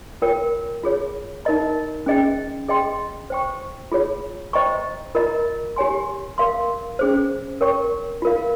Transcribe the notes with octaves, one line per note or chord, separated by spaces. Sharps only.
F4 A#4 C#5 G5
F4 G#4 C#5
D#4 A#4 D#5 A#5
C#4 G#4 D#5 G5
G#4 D#5 G5 C6
C5 G5 C#6
F4 G#4 C#5
C5 D#5 G5 A#5 C#6
F4 A#4 D#5 A#5
G4 C#5 G#5 C6
A#4 F5 C6
C#4 G#4 C5
A#4 C#5 G5 C#6
F4 A#4 F5